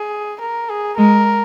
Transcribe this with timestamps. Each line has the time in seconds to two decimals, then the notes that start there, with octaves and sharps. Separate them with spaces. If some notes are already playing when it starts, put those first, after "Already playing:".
Already playing: G#4
0.41 A#4
0.69 G#4
0.97 G#3 A#4